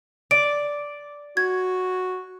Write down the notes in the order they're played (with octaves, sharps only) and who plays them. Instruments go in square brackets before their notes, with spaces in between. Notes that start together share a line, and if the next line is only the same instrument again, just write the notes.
[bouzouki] D5 [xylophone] D7
[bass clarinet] F#4 [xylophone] G#6